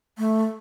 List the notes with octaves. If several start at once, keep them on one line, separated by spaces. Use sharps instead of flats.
A3